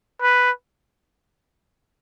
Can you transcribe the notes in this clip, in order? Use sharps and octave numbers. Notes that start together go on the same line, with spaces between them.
B4